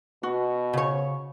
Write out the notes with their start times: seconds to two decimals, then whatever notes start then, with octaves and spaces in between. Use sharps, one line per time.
0.23 B2 F#4
0.73 C#3 C#5